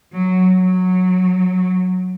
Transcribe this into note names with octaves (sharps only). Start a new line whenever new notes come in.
F#3
F#3